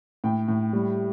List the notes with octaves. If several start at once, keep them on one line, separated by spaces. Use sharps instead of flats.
A2 G5
A2
G3